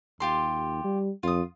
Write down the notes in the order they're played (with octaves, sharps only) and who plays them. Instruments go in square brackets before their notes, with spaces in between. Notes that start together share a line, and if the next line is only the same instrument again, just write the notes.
[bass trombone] D#2 [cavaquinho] F4 G4 C6
[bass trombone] G3
[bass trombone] F2 [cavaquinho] F4 D#6